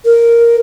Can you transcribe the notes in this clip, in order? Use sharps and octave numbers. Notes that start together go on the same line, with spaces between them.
A#4